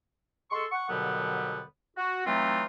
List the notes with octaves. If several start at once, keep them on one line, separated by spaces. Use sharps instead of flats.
G#3 A4 C6 C#6
F#5 C#6
D#2 B2 D3 F#3 G3 B3
F#4
E3 F#3 A3 C4 D#4 F4